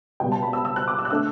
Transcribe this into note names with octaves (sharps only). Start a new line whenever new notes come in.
C#2 B2 G3 G5
A5
B5
E6
E6
F#6
D6
E6
F#6
D3 A3 E6